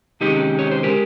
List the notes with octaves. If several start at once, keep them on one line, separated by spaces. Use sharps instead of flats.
C3 D#3 G#3 C#4 D#4 G4
C#5
C5
C#3 G#3 G4 A#4